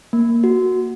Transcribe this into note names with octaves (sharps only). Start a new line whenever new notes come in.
A#3
F#4